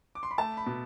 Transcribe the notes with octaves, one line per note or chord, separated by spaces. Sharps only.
D6
C6
B5
A3 A5
B5
B2